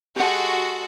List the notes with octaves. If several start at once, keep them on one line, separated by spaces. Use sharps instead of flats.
G#3 F#4 G4 A4 F#5